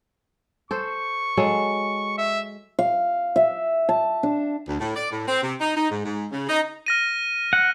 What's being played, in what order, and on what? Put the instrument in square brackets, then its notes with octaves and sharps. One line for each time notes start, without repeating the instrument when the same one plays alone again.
[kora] A4 C5 [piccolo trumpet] C#6
[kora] F#3 G#3 A4
[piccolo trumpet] E5
[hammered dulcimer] F5
E5
A5
D4
[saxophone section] D2
A2
D5
A2
C4
C3
D#4
D#4
G#2
G#2
C#3
D#4
[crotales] F6 A#6 D#7
[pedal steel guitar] F#5